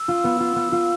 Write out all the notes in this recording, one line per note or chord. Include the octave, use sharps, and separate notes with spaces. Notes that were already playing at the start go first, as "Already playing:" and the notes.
Already playing: E6
F4
B3
F4
B3
F4